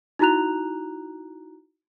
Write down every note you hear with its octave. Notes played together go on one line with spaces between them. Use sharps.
D#4 E4 F#4 A#5 F#6 F7